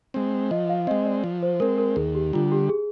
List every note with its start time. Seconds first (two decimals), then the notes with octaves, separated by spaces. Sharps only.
0.14 G#3 C4
0.51 F3 D#5
0.69 F5
0.87 G#3 C4 D#5
1.06 D5
1.24 F3
1.43 C5
1.60 G#3 C4 A#4
1.78 A#4
1.96 D#2 G#4
2.15 G4
2.33 D3 G3 F4
2.52 G4
2.69 G#4